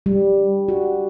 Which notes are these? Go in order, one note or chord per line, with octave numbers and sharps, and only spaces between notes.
G3
F#4